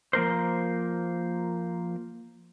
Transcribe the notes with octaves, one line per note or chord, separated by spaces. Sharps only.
F3 A#3 A#4 C5